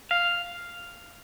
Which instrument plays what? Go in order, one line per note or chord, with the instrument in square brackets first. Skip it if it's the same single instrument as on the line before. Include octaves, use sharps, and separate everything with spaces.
[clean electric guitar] F5